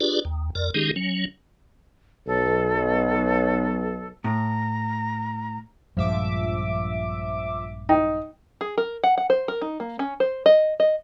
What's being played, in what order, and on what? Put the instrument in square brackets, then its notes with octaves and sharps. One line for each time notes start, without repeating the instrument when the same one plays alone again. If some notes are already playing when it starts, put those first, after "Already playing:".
[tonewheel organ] D4 F4 G4 G#4 B4 D5
D#2
F2 A#4 D5
D#3 G#3 C#4 D#4 G4 G#4
F#3 C#4
[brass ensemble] B1 [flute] A4
[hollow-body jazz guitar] A2 [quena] A#5
[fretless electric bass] A#1 G2 G#3 [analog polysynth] F3 E5 D6
[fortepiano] D#4 [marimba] G5
[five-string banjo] G#4
A#4
F#5
F#5
C5
A#4
D#4
A#3
C#4
C5
D#5
D#5